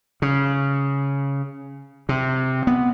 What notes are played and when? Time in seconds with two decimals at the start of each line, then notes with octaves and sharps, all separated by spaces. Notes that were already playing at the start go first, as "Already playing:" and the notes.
0.22 C#3
2.09 C3
2.67 B3